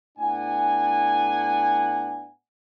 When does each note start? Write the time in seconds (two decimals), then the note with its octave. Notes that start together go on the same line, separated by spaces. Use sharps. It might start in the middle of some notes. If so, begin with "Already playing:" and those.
0.18 A2 B3 D4 F#5 G#5